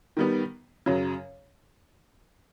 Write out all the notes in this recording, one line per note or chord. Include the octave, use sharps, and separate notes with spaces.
D#3 G3 B3
F#2 C#3 F#3